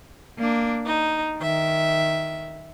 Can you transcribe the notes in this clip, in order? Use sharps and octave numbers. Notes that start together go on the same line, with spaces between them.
A#3 D4
D#4
D#3 E5